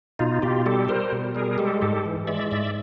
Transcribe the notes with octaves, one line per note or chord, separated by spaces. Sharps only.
B2 D#4 F4
B2 F4 G4
G3 G4 A4
G3 A#4 C5
B2
G3 G#4 A#4
G#3 G4 A4
G#2 G4 A4
E3
G#3 D5 E5
G#2 D5 E5